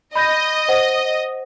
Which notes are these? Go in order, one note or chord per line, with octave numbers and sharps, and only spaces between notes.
D#5 B5 G6 A#6
C5 F#5